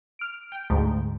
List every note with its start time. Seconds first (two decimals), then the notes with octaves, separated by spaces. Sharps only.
0.19 F6 D7
0.52 G5
0.70 D2 G#2